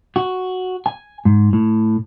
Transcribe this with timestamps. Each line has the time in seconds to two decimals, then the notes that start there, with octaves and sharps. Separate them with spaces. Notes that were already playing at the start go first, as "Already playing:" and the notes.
0.16 F#4
0.86 G#5
1.25 G#2
1.53 A2